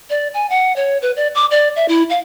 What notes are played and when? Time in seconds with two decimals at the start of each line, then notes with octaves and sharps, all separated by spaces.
0.10 D5
0.34 G#5
0.50 F#5
0.76 C#5
1.02 B4
1.17 D5
1.35 D6
1.51 D5
1.76 E5
1.88 E4
2.10 F5